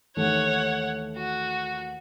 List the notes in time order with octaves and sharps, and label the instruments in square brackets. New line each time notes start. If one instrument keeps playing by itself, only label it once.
[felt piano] D#2 E3 A3 [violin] C#5 F#5
[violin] F#4